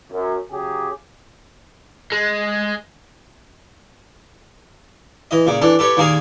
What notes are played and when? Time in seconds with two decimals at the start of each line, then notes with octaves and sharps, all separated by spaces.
0.11 F#2
0.51 C#3 F#3 G4 G#4
2.12 G#3
5.31 E3 D#5
5.47 A#2 C#3
5.62 E3 D4 A4
5.79 G4 A4 B4 C#5
5.97 D#2 A#2 A#3 G#4 G#5 A#5